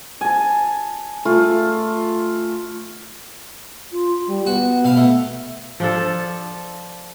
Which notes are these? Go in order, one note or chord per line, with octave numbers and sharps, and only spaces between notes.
G#5 A5
A3 F4
F4
G3
B3 F#4
B2 F5
A3
F3 D4 A4